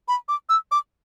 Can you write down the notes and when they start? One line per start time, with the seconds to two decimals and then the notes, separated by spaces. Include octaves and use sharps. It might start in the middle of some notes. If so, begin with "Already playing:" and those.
0.08 B5
0.28 D6
0.49 E6
0.71 D6